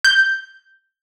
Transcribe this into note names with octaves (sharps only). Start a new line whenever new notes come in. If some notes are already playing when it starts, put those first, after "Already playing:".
G6